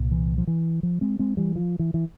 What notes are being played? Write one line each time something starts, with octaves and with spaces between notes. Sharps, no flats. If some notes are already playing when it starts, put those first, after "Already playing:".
Already playing: C2 A#2
E3
F3
E3
F3
G#3 C4
G#3 C4
E3 G3
F3
E3
E3